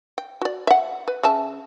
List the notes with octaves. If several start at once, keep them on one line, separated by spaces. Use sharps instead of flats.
G5
F#4 D5
E5 F#5
B4
C#3 E5 A5